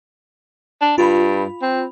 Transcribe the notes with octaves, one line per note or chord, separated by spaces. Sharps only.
D4
G2 F4 B5
C4